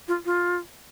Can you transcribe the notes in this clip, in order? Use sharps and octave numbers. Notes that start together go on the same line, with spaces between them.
F4
F4